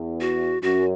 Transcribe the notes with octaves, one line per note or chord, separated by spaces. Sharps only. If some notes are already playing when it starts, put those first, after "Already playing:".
Already playing: E2
F#4
F#2 F#4